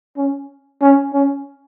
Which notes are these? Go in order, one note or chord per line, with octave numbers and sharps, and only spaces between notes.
C#4
C#4
C#4